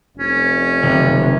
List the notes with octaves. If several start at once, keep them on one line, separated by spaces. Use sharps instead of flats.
F1 C#4
F#1 C3 D#3